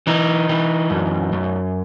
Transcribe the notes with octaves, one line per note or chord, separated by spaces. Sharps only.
E3 D#4
E3
F#2
F#2